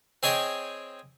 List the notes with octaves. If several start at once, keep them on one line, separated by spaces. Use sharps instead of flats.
C4 G#4 C#5 D#5 G5